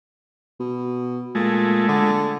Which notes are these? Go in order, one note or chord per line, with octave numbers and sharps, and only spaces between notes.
B2
A#2 G#3 A3
D3